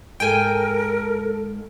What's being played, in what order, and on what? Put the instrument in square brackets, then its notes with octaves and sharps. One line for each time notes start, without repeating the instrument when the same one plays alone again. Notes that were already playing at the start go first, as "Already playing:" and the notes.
[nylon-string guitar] G#2 G#3 E4 [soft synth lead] A4 [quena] A#4 [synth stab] G5 G#5